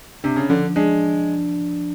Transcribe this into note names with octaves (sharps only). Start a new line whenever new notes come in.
C3 D4
C#3
D3 F3
G#3 D4